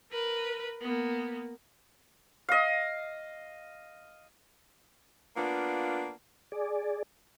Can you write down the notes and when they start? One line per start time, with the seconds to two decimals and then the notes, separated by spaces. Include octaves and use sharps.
0.11 A#4 B4
0.81 A#3 B3
2.49 D#5 F5
5.37 A#3 B3 D4 F4
6.52 G#4 D5